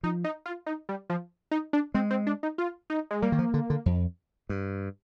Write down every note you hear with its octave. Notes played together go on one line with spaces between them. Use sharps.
F3 D#4
D#4
F4
D#4
G3
F3
D#4
D4
G#3 C4
C4
D4
D#4
F4
D#4
G#3
G3 A#3
D#3
F3
D3
D3
F2
G2